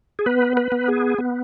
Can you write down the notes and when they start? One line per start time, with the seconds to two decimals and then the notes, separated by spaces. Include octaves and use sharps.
0.19 G#4
0.26 B3 B4
0.57 B4
0.72 B3
0.88 G#4
1.18 B3